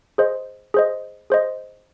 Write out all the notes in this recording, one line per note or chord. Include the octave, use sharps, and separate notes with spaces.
G#4 C5 D#5
G#4 C5 D#5
G#4 C5 D#5